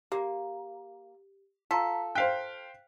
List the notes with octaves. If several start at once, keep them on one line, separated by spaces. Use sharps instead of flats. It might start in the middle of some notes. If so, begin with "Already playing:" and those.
A#3 G4
F4 A4 A#5 B6
C5 F5 G5 F#6 B6